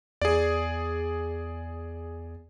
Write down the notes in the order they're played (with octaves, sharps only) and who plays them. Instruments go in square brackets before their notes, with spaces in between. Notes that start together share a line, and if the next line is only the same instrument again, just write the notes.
[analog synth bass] E2 [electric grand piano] G#4 D5